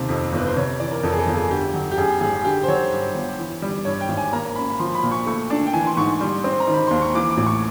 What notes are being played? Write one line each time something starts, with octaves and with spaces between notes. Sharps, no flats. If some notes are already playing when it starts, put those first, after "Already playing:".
Already playing: D#2 C3 D#3 C5
F2
G1 B4
C5
C3 C#5
E3 D5
A#4
F2 A4
G#4
A4
G1
G#4
D3 G4
F#3
G4
F#2 G#4
G#1 G#4
D3 G4
C5
F#3 C#5
G2
G1
E3
G3
G2 C#5
G5
G#1
G#5
A#3 A#5
C#4 B5
B5
F3 C6
B5
A#2
C#6
A3 C#6
D4 A5
G5
E3 G#5
C6
G#2 C#6
G3 C6
C4 C6
A#5
D#3
B5
D#2 C6
C#6
E3 D6
D6
A1
C#6